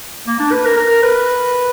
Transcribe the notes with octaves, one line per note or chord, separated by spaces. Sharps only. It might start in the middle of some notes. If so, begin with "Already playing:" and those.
A#3
D4
B4
A#4
A#4
B4